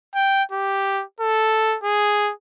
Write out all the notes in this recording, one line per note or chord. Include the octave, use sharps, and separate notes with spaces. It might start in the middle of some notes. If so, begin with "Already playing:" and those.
G5
G4
A4
G#4